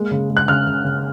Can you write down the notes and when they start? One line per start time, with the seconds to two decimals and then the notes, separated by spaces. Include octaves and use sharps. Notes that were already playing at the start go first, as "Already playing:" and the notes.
Already playing: G#3 A#3
0.11 C#3
0.30 G#3
0.37 F#6
0.48 C#3 F6
0.66 C#3
0.84 C#3